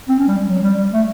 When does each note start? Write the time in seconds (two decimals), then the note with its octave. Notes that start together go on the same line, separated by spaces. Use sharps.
0.08 C4
0.18 C#4
0.27 G3
0.38 G3
0.48 F#3
0.62 G3
0.77 G3
0.92 A3